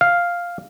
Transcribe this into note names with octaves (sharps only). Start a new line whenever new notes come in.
F5